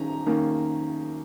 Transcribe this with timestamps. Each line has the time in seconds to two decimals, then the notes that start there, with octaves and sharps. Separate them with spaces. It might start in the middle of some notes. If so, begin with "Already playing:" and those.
Already playing: D#3 C#4 A#5
0.26 D#3 A#3 C#4